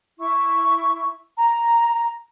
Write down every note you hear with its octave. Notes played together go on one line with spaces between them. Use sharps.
E4 C#6
A#5